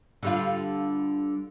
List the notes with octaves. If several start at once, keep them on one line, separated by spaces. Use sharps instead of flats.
D3 G3 F4